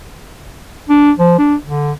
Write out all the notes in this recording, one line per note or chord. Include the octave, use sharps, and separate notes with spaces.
D4
F3
D4
D3